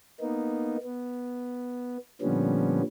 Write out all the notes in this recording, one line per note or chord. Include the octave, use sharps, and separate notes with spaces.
A#3 B3 D#4
B3
A#2 D3 F3 G3 B3 C#4